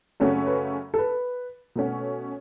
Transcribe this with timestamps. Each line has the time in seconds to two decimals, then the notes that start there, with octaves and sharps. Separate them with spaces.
0.20 F#2 C#3 A3 C#4 F#4 A4 C#5
0.46 B4
0.94 A4
0.98 B4
1.76 B2 A3 C#4 F#4